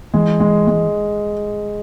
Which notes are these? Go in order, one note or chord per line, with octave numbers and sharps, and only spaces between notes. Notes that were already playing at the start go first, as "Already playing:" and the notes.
E3 G#3
G#3
G#3